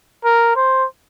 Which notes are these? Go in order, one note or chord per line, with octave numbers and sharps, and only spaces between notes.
A#4
C5